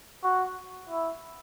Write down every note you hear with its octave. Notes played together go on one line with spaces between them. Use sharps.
F#4
E4